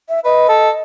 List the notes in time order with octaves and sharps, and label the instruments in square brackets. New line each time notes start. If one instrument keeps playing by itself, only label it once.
[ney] E5
[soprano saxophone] B4 [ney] D#5
[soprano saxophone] A4